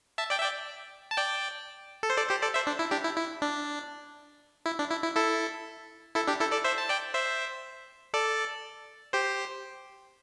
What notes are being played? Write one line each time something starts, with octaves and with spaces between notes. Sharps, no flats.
E5 A5
D5 G5
E5
D5 G5
A5
D5 G5
A4
C5
A4 D5
G4 C5
A4 D5
C5 E5
D4
E4
D4 G4
E4
E4
D4
E4
D4
E4
E4
E4 A4
E4 A4
D4 G4
E4 A4
A4 D5
C5 E5
A5
D5 G5
C5 E5
A4 D5
G4 C5